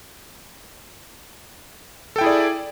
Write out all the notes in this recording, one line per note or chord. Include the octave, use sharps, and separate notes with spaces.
E4 G#4 A4 D5 G5